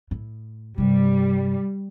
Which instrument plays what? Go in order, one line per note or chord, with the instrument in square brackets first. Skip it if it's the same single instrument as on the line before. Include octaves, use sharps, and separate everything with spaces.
[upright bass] A2
[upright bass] G2 C3 [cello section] G3